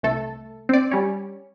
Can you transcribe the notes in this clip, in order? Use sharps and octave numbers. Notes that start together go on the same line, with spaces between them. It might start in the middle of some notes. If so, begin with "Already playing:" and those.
C2 A3 A4
C4 D5
G3 C#4